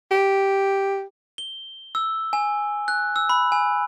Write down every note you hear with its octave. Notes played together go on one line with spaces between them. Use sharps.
G4
G7
E6
G#5
F#6
E6
B5
G#5